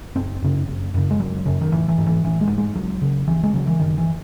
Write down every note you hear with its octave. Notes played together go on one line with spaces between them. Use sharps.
F#1 C4
F#2 C#3
F#1
F#2 C#3
G#3
F#1 F#3
F#2 C#3
D#3
A1 E3
E3
G#2
E3
A1 E3
G#3
G#2
G#3
C#2 F#3
C#3
C#2 E3
G#3
C#3 F#3
E3
F#1 D#3
E3